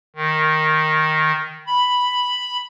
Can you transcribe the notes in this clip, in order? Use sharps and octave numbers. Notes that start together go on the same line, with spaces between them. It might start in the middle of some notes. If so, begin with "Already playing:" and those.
D#3
B5